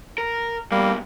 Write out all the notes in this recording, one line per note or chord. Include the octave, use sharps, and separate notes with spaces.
A#4
G2 B2 G3 A#3